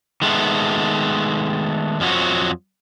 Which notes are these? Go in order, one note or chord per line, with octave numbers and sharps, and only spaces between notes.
D#3 G#3 A3 B3
F2 F3 F#3 F#4